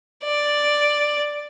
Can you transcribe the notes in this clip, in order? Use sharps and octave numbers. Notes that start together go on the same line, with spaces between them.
D5